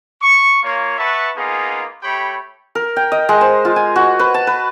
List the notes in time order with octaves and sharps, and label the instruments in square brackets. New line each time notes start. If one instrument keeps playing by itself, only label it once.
[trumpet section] C#6
A#3 F4 C#5
B4 E5 F#5 A5 B5 C#6
A#3 B3 D#4 F4 G#4
A3 G4 C#5 G5 B5
[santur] A#4
G5
D#5
G#3
C5
F4
G#5
F#4
B4
A5
B4